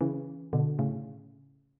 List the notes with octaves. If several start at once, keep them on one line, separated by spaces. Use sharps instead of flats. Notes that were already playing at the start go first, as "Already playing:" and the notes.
C#3 E3
B2 D3
A2 C#3